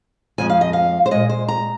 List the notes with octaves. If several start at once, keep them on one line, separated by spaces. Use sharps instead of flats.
F2 C3 F3 G#3 G#5
F5
D#5
F5
C5
A#2 G#3 D#5
C5
A#5